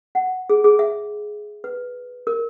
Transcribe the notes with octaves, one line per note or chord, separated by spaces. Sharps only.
F#5
G#4
G#4
E5
B4
A#4